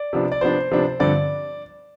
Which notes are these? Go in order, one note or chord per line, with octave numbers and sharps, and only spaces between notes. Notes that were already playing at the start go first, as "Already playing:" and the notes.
Already playing: D5
C3 F3 B3 D4
D5
C3 F3 B3 D4 C5
C3 F3 B3 D4
G2 D3 F3 C4 D5